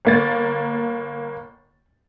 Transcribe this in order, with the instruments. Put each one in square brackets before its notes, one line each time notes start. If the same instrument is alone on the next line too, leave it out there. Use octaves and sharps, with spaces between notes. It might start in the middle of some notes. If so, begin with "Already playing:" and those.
[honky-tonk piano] G1 A#3 A6